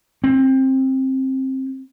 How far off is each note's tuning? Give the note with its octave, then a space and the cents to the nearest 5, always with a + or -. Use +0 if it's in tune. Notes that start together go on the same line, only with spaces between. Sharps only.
C4 +20